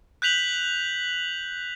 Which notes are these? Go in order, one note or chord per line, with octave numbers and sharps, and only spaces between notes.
F#6 G6 B6 F7 F#7